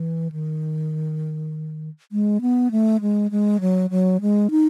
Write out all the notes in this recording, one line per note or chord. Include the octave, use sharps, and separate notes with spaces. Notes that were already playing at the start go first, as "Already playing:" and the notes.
Already playing: E3
D#3
G#3
B3
A3
G#3
G#3
F#3
F#3
G#3
D#4